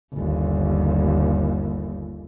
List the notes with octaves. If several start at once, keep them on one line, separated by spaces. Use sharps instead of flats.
G1 D#2